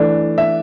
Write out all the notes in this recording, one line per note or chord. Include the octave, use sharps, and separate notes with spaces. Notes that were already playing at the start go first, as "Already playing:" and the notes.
Already playing: E3 A3 D4
E5